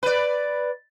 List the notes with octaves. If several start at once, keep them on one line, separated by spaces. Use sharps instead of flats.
B4 D5